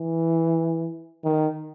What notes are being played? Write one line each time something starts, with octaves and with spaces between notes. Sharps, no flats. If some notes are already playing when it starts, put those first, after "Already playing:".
Already playing: E3
D#3